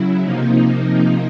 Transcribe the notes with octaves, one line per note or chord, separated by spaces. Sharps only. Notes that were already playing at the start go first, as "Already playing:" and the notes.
Already playing: C#3 F#3 E4
C3 F3 A#3 D#4